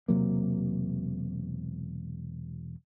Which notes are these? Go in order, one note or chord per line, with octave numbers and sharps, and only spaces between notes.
E1 C3 F#3 A#3